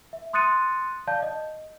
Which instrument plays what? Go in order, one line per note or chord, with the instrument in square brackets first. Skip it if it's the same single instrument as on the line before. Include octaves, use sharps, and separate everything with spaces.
[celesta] E5
C6 D#6 F#6 A6 C#7 D#7
D5 F5 A5 G6
D#5